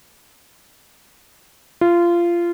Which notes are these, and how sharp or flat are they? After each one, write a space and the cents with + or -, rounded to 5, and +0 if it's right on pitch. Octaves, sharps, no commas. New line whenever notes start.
F4 -20